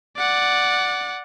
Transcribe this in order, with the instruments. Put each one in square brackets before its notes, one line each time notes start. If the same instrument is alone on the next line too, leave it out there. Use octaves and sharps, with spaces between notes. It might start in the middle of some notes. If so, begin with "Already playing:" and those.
[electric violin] D5 F#5